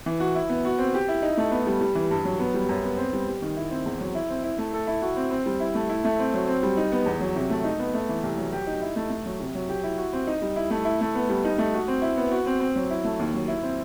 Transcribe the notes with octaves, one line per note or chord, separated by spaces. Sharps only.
E3
F#4
E4
B3
F#4
C4
G4
E4
D#4
A3
B3
G3
G3
E3
G2
F#3
B3
G3
F#2
B3
C4
G3
G3
D#3
E4
C4
E2
F#3
E4
C4
E4
A3
A4
E4
F#4
C4
C4
G3
E4
A3
E4
A3
C4
F#3
C4
G3
D#4
B3
E2
F#3
C3
A3
D#4
B3
A3
E3
C2
F#3
G4
D#4
E4
A3
A3
F#3
C3
F#3
G4
E4
F#4
C4
D#4
G3
E4
A3
E4
A3
B3
G3
D#4
A3
F#4
C4
E4
B3
F#4
C4
C4
F#3
E4
A3
D#2
F#3
E4
C4